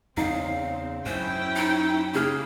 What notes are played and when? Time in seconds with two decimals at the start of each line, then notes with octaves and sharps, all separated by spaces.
0.17 E2 C#3 C4 D#4 F5
1.06 F#2 C#4 E4 C5 G5
1.56 D#4
2.14 C#3 A#3 G#4 F6